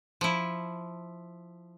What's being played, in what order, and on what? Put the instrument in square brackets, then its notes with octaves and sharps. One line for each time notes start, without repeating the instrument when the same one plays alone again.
[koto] F3 E4